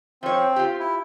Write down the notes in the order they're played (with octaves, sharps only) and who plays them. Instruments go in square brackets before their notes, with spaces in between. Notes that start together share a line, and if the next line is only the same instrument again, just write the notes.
[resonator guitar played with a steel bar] F3 C#5 [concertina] C4
[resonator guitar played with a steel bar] F4 G4
[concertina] E4